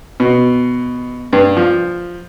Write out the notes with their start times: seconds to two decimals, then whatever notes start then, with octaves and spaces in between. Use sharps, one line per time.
0.20 B2
1.33 G2
1.57 F3